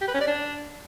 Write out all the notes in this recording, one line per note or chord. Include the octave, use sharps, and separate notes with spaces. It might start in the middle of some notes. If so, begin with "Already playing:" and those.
G4
B4
C#4
D5
D4